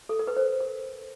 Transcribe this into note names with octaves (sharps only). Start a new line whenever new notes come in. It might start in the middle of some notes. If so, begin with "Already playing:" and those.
A4
A#4
B4
C5
A#4